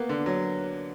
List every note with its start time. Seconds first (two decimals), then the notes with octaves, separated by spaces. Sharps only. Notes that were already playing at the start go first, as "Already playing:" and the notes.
Already playing: A#3 B3
0.09 D3
0.26 F#3